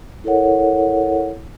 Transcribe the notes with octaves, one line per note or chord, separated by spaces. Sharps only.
E4 A4 A#4 C#5 F#5